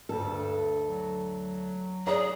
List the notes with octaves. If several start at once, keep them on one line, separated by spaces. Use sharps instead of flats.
D2 G2 A4
F#3
G#4 C#5 D5 A#5